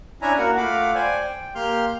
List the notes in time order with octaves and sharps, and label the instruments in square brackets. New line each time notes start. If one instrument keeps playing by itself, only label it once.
[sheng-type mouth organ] C#4 D4 E4 E5 G#5 A#5
A#3 F#4 A#4 F#5
A3 F4 F5 F#5 B5 D6
C5 D5 G5 G#5
G5
A#3 G4 C6 F6 G6